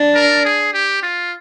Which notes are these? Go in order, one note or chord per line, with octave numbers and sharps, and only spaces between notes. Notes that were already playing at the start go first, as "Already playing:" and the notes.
Already playing: D4
A#4
G#4
G4
F4